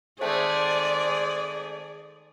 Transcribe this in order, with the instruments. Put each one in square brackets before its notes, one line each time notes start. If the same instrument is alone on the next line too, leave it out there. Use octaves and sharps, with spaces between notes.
[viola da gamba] D#3 G#4 [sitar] G#3 A3 C4 [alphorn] C5 [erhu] D5